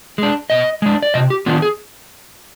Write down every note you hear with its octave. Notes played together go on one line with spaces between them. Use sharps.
G#3 D4
B2 D#5
G#3 D4
D5
C3 D#5
G4
D#3 B3 D4 F4
G#4